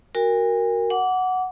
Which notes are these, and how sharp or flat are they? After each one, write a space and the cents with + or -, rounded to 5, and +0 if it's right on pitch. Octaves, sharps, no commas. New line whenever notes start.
F#4 +5 A#4 +0 G#5 -45
F#5 +0 D6 -25